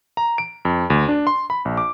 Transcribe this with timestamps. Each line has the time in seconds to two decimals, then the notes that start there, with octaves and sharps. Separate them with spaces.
0.17 A#5
0.38 D7
0.65 F2
0.90 D2
1.09 D4
1.27 C6
1.50 B5
1.65 A#1
1.77 D6